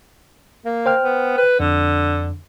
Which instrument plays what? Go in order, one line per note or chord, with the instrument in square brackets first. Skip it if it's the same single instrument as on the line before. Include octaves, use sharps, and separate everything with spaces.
[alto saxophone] A#3
[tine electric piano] C5 G5 F6
[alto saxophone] B3
B4
[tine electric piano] F2 [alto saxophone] D3